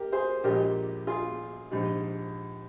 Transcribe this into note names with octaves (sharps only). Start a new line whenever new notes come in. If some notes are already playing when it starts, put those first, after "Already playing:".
Already playing: G4 A#4
G#4 C5
A#1 A#2 G#3 G4 A#4
F4 G#4
A#1 G#2 G3